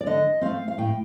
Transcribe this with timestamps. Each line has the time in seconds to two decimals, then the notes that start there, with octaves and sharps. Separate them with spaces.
0.01 D5
0.06 D3 D#5
0.41 A3 C4 F5
0.68 F5
0.78 A2 G5